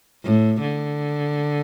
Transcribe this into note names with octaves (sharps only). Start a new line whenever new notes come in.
A2
D3